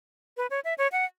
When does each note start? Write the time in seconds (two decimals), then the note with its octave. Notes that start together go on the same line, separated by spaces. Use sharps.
0.37 B4
0.50 C#5
0.64 E5
0.78 C#5
0.92 F#5